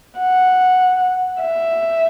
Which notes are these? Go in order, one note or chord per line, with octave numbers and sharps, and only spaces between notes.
F#5
E5